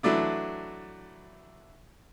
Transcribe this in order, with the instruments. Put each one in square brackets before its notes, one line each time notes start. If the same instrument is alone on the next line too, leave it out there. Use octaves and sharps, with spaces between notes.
[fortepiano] E3 F#3 A3 D4 E4